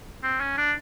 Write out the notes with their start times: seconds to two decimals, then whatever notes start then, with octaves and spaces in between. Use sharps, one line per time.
0.23 C4
0.40 C#4
0.58 D4